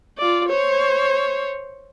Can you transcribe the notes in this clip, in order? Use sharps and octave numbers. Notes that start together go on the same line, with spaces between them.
F4 D5
C5 C#5